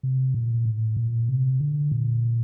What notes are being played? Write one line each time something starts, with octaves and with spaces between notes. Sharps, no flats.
C3
A#2
A2
A#2
C3
D3
A#2